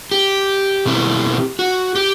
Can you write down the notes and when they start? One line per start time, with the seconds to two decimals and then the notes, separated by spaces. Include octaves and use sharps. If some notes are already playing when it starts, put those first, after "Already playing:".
0.11 G4
0.86 B2 A3 C4 E4
1.59 F#4
1.96 G4